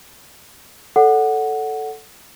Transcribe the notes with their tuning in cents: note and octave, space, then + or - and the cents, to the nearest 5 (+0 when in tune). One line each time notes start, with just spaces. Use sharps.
A4 +0 C#5 +40 F#5 +0